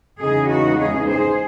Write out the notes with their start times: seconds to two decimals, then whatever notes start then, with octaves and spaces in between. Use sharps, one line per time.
0.19 E2 C#3 G#3 D#4 G#4
0.48 F#4
0.78 G#4
1.07 G#4 C5